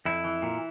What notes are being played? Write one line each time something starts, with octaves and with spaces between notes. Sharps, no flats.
F2 E4
E3
A#2